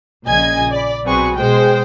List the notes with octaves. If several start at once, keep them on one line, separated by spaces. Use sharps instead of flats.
A#1 A#2 C#3 D#5 G#5 G#6
D5 B5
B1 C4 F#4 G#4 B4 C#6
B2 G#3 C5 G5